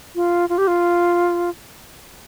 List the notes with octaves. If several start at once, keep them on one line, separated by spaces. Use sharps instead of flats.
F4
F4
G4
F4